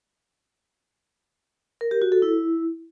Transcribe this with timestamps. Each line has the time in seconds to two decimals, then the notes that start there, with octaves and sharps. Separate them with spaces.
1.81 A#4
1.91 G4
2.02 F#4
2.12 A4
2.22 E4